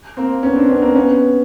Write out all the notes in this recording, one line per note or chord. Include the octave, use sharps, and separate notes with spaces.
A#3 C4
B3 C#4
C4 D4
B3 C#4
A#3 C4
B3 C#4